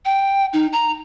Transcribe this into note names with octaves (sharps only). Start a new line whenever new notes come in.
G5
D#4
A#5